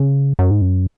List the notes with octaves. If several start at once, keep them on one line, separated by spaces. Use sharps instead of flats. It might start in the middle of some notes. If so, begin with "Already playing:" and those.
Already playing: C#3
F#2
G#2
F#2